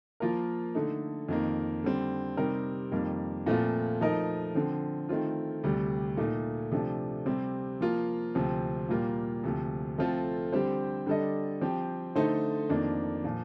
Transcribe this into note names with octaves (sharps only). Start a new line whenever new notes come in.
F3 A#3 F4 A#4
D3 A3 D#4
F2 D#3 A#3
D3 G3 C4
C3 G3 C4 D#4 A#4
F2 D#3 G3 A#3
A#2 F3 A3 C4 F4
F3 A3 D#4 A#4 D#5
D3 F3 C4
D#3 A3 C4 F4
D2 C3 G3
A#2 A3 D#4
C3 F3 A3 D4
C3 G3 C4
F3 A#3 F4
D2 C3 F3 C4
A#2 G3 A#3 F4
D2 C3 F3
F3 A3 C4 F4 A4
D3 G3 C4 G4 C5
D3 G3 D4 A4 D#5
F3 C4 G4
D3 A3 D#4 A4 C5
F2 D#3 A#3 D4
A#2 F3